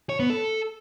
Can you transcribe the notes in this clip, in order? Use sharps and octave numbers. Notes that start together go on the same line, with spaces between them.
C#5
B3
A4